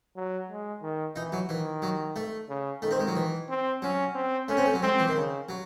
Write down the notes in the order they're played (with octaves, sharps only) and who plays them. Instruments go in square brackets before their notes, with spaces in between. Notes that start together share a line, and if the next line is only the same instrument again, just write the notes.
[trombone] F#3
G#3
D#3
[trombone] E3 [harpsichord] D#4
[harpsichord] F#3
[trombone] D#3 [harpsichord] E3
[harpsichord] F#3
A3
[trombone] C#3
[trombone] D#3 [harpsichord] A3
[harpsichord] C4
G#3
F#3
E3
[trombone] C4
[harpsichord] F#3 [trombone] C#4
[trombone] C4
[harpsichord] A3 [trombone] C#4
[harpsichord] C4
A3
F#3
[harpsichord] G#3 [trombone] C4
[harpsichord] E3
D#3
[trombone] C#3
[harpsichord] F#3